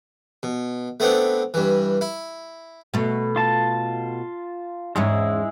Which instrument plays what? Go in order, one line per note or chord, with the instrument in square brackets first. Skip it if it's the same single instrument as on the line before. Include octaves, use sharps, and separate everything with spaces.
[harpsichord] B2
A3 B3 C4 D4
G2 E3
E4
[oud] B2 A3
[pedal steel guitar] F4 A5
[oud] E2 G#2 C#4 [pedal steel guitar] G#3 E4